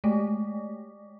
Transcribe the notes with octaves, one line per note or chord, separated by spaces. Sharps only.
G#3 A3